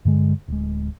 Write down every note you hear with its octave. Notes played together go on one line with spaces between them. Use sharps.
G2 D3 G#3
D1 G#3